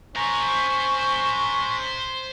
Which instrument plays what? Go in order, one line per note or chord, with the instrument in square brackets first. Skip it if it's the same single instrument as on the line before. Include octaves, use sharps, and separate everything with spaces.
[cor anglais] C#4 [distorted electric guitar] C5 A#5